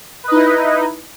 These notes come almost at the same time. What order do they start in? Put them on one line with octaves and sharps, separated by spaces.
B4 D#5 D#4 E4